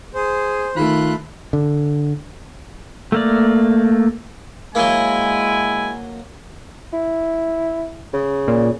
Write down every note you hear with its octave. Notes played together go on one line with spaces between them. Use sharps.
G#4 C5
D#3 A3 F4 B5 F#6
D3
A3 A#3 D5
F#3 G#3 A#3 E4 G#5
E4
C#3
A#2